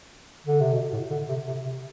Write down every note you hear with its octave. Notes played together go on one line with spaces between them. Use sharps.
D3
C3
B2
A2
D3
C3
C3
C3